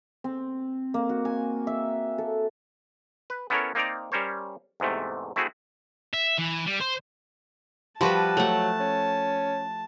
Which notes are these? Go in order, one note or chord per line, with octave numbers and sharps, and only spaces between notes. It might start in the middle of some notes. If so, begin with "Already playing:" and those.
C4
A#3
F#4
G#5
E5
A4
B4
B3 C#4 E4 A4 A#4 C#5
A#3 C4 D#4 A#4 D5 A#5
G3 C#4 A#4 C5 C#5
E2 G#2 C3 A3
A3 C4 E4 F#4 G#4
E5
E3
G3
C5
F3 G3 F#4 B4 A5
F#3 A3 F#5
C#4